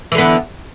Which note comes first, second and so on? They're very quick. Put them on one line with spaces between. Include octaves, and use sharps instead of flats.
E3 D3 B3